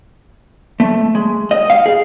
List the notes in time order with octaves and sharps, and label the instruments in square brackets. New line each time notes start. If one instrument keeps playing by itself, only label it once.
[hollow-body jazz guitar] A3
G#3
D#5
F5
G#4